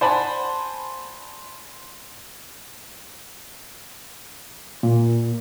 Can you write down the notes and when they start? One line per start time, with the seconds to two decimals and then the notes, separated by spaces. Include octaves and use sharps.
0.01 C5 D5 F#5 G#5 A5 B5
4.83 A#2